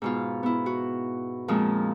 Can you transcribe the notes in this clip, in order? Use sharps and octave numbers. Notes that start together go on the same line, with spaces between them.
G#2 B2 F4
B3 E4
F#4
F2 A#2 F3 G#3